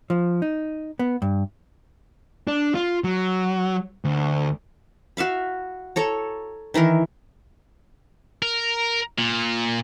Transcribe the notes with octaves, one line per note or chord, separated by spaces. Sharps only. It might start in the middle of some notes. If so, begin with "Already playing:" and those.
F3
D#4
B3
G2
D4
F4
F#3
D2
F#4 E5 F5 B5
A4 C#5 A#5
D#3 E3 E4 A#4
A#4
A#2